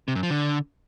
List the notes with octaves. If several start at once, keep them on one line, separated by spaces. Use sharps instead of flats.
C3
F#2
F3
D3